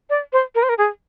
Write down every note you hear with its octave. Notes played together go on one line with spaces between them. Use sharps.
D5
C5
A#4
C5
A#4
G#4